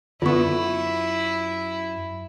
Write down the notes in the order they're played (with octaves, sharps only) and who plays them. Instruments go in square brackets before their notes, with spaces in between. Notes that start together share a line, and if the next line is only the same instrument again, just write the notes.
[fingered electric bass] F#2 [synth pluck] D3 B3 [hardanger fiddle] E4 [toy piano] F4 C#6